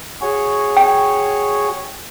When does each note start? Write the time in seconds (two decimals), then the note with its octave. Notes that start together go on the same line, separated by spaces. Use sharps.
0.22 F#4 G#4 C#5
0.77 G5